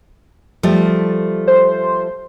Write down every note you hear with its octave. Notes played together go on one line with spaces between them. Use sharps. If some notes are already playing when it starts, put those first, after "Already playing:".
F3 G3 A3
C5